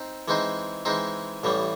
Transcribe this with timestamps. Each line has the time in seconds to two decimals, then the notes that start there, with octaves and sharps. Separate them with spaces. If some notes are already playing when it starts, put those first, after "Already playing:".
Already playing: C4 D#4
0.28 E3 G#3 C4 D#4
0.85 E3 G#3 C4 D#4
1.43 A1 A2 E3 G3